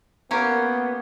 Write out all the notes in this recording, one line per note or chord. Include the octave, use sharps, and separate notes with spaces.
A#3 B3 C#4 G4